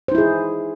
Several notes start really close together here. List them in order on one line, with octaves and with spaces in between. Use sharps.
C5 D#4 E4 G#4